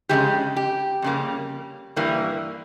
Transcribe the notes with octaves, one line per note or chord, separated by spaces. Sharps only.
F2 C#3 E3 G#3 G4
G4
F2 C#3 G3 A#3
G2 E3 G3 A#3